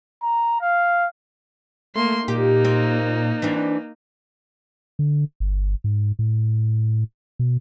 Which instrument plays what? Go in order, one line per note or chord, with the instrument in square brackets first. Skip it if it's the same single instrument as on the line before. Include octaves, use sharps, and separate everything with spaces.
[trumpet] A#5
F5
[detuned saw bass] A3 [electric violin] A#3 C6
[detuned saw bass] A#2 [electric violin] A#3 D#4 [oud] G4
[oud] C4
E3 C4 D4
[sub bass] D3
G1
G#2
A2
B2